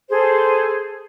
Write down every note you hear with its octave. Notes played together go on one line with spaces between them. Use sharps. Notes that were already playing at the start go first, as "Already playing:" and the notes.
G#4 A4 C5